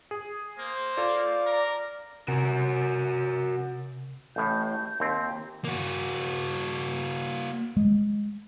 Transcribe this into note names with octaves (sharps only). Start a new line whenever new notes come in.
G#4
A#3 C5
F4 A4 D5 F5
A#4 A#5
C3 F#4 A#4
A1 A2 G6
D#2 C4
A#3 F#4
G#3